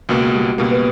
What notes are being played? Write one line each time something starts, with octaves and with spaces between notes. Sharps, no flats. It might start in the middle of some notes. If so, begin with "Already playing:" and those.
C#2 B2 A#3 F#4
G3
C#2 B2 G3 A#3
B3